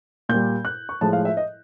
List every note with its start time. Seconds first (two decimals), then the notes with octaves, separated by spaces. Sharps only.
0.29 A#2 G3 G6
0.65 F#6
0.89 C#6
1.01 A2 F3 G#3 A5
1.13 F5
1.25 E5
1.37 D#5